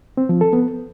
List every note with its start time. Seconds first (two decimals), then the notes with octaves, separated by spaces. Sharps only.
0.17 C4
0.29 F3
0.41 A4
0.53 B3